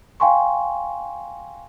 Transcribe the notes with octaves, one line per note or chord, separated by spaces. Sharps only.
F5 G5 G#5 C6 C#6